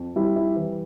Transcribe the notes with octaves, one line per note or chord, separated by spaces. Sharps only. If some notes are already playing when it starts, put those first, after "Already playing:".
Already playing: F2
G3 E4
E4
E3